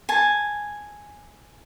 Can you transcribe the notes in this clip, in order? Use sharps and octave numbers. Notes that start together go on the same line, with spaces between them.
G#5 A5